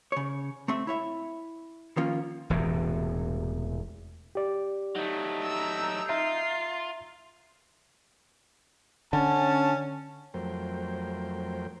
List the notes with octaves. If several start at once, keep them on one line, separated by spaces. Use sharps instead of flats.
C#3 C#5
A3 C4 E5
E4 C#5 E5
D#3 F3 A#3 C#4 F4
E1 E2 A2 C3
G4 D5
F#3 A3 D#4
A#5 E6
F4 E5 A#5 C7
D3 C#4 A5
F2 F#3 A3 A#4 C5 G5